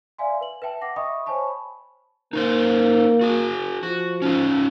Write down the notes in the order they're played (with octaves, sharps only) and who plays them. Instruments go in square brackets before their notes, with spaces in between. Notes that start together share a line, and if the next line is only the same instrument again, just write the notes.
[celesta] D5 E5 F5 G#5 C6
B4 F#7
B4 E5 G5 A5
F#5 D6 A#6
D#5 E5 G5 B5 C#6 D#6
C5 C#5 G#5 A5 B5 C#6
[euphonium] A#3 [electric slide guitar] D#4 B4 C5
[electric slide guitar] F#4 G#4
[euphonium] F3 [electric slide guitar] F#4
[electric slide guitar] C#4 D#4 F4